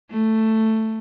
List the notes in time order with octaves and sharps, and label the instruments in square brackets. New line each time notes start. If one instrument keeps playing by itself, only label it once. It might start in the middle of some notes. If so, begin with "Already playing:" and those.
[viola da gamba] A3